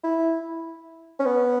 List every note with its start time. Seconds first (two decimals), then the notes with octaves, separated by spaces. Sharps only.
0.04 E4
1.20 C#4
1.25 B3